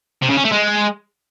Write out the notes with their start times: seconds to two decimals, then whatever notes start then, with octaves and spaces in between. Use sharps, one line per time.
0.22 C3
0.29 C#3
0.37 C#4
0.44 A3
0.52 G#3